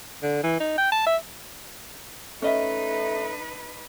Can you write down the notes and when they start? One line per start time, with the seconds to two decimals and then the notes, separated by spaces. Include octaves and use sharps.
0.23 D3
0.43 E3
0.60 D#4
0.78 G5
0.92 A5
1.06 E5
2.42 A3 C#4 D#4 B4 D#5 E5